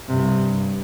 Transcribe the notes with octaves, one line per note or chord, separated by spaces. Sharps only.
G2 C3